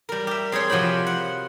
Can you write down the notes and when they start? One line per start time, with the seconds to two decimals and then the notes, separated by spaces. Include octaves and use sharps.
0.09 G3 A#4
0.27 G4 E5
0.52 C4 G#4 C5 C#5
0.70 C3 F3 F#4 G5 B5
1.07 F#5